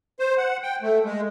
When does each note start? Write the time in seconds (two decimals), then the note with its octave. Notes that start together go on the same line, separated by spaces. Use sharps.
0.19 C5
0.38 F#5
0.63 G5
0.82 A3
1.05 G#3